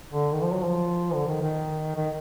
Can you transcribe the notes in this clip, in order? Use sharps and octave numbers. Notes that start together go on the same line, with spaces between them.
D3
D#3
F3
F#3
F3
D3
D#3
D#3
D#3